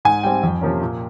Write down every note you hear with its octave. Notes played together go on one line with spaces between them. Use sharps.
G#2 G#5
G3 C4 G5
F2
C3 F3 A#3 C#4
A#2